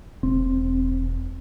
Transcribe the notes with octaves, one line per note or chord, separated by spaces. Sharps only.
E1 C4